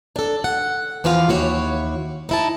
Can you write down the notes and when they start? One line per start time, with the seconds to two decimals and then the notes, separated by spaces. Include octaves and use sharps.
0.16 D4 A4
0.44 F#5
1.04 E2 E3 F3 F4 F5
1.29 D#2 E4 F#4 C#5
2.29 D#4 E4 A5